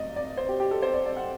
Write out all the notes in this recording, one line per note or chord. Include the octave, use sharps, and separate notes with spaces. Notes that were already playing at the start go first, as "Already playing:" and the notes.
Already playing: G2 F#3 A3 D5 D#5
D5
C5
G4
G4
A4
C5
D5
D5
F#5